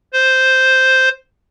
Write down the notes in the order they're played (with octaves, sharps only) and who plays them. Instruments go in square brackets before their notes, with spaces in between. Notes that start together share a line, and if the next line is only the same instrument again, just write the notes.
[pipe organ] C5